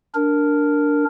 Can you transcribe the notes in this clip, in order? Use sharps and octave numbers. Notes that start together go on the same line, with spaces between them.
D4 A#4